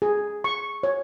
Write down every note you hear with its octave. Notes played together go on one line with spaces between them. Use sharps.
G#4
C#6
C#5